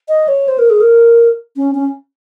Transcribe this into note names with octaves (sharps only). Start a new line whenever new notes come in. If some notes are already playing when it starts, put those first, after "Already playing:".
D#5
C#5
C5
A#4
G#4
A#4
C#4
C#4